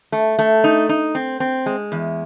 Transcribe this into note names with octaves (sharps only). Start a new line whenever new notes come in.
A3
A3
D#4
D#4
C4
C4
G#3
E2